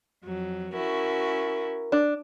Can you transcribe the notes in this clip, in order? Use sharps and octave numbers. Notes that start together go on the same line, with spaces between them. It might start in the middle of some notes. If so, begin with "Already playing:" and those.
F2 F#3
C#4 E4 F#4 A#4
D4